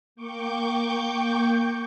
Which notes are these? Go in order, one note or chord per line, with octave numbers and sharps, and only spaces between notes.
A#3 G5 C#6 D6 G6